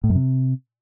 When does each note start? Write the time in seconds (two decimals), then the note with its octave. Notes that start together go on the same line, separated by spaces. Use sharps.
0.04 A2
0.09 F#2
0.15 C3